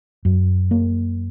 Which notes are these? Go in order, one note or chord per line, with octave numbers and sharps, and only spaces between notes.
F#2
A#3